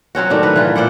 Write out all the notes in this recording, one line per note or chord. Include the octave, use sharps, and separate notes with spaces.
F#3 C4 C#4 F#4
A2 D#3 D4 F#4
B4
E3 F4
A#2 C5 D5 F#5